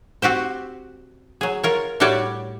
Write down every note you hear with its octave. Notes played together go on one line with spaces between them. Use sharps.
C4 F#4 G4 C5
F#3 G#4
F4 A#4 C#5
A2 G3 F#4 G4 C#5 D5